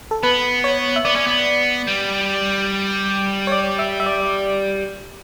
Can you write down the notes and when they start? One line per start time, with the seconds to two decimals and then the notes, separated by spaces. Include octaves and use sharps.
0.11 A4
0.23 B3 B4
0.64 C#5
0.96 E5
1.05 B3 D5
1.16 C#4
1.27 B3
1.87 G3
3.47 C#5
3.52 D5
3.79 E5
4.00 E5
4.06 D5